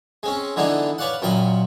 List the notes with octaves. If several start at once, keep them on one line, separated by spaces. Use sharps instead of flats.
G#3 C4 C#4
D3 E3 G#3 B3 D4 D#4
B4 C#5 D5 F5 F#5
F#2 A#2 G5 G#5 B5 D#6